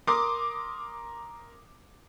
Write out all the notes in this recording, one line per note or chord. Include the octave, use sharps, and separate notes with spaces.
A#4 C6 D6 D#6